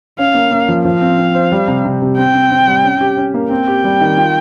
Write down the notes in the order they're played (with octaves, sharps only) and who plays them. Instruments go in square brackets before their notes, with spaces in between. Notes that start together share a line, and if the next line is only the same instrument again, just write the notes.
[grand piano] C#4 [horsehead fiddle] F5
[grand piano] A#3
A#3
F3
[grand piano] F3 [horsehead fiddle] F5
[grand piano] C4
C4
C5
G3
C3
C3
C3
[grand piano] C4 [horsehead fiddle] G5
[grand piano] C4
C4
G3
C#4
G4
C#4
A#3
[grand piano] C4 [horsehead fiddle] G5
[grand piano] G4
G3
D#3
F4